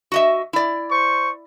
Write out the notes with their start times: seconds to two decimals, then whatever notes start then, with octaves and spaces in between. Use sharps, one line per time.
0.12 F#4 D#5 E5
0.53 E4 D5
0.91 C5 C#6